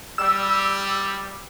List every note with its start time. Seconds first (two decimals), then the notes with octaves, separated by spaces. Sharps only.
0.18 G3 E6